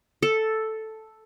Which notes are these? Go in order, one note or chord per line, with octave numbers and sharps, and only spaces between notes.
A4